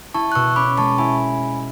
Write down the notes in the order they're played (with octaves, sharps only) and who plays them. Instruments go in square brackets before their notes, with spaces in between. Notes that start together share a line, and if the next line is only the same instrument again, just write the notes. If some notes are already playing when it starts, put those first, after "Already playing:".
[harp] E4 [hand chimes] A5 C#6
[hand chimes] F#6
[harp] B2 [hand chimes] C#6 E6
[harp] C#4 [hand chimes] B5 D6
[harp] G#3 [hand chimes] A5 C#6
[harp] E4 [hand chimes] G#5 B5